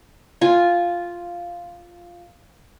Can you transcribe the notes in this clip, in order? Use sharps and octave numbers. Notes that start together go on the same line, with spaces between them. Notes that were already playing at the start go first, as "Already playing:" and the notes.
F4 G#5